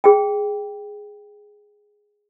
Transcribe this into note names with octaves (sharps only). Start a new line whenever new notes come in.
G#4 G5